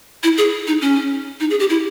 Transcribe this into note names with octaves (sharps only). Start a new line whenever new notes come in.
E4
G#4
D#4
C#4
D#4
G#4
G4
E4